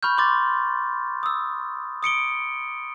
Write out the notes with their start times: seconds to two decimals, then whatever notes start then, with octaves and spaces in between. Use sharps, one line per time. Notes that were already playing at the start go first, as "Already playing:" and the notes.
0.03 B5 C#6 F6 G6
0.18 C6 D6 A6
1.23 D#6 E6
2.03 D#6 C#7 D7 G7